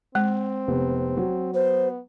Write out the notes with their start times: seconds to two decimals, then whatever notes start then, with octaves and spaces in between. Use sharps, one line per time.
0.15 G#3 C4
0.68 F1 B3
1.17 F#3
1.54 B3 C5